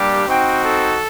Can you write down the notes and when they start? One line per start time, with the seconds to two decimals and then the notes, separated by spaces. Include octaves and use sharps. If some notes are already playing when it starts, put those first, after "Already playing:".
Already playing: G3 A#3 D4 G4
0.28 C4 D#4 F#4 G5
0.64 A4